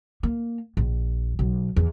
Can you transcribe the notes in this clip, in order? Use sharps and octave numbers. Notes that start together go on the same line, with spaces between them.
A#3
A#1
B1
E2